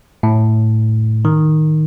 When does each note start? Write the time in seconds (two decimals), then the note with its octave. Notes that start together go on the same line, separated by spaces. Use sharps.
0.23 A2
1.25 D#3